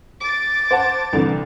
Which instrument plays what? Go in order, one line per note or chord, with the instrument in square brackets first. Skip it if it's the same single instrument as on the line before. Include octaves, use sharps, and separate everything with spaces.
[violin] D6 A6
[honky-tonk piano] C5 F#5 A5
C2 D3 E3